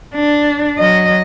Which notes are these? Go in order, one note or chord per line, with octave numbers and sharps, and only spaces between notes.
D4
F#3 D#5